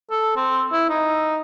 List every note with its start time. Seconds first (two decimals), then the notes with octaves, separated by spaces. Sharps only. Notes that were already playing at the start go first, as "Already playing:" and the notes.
0.11 A4
0.36 C4
0.72 E4
0.89 D#4